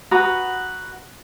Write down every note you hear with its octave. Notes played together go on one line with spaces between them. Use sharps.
F#4 B4 A#5 D#6